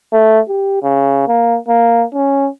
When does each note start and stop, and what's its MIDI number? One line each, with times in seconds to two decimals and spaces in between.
0.13 0.40 57
0.48 0.78 67
0.83 1.27 49
1.27 1.58 58
1.68 2.04 58
2.14 2.48 61